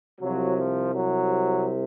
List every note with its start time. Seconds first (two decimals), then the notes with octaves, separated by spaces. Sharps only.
0.20 C2 C3 F3 F#3
0.56 F3
0.93 F#3